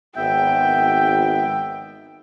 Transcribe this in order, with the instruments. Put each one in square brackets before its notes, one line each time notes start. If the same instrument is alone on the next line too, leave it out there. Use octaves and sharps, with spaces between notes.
[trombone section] G#1 [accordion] B3 E5 G6 [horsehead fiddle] G5